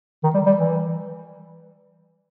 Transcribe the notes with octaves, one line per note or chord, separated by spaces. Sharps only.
D#3
G3
G3
E3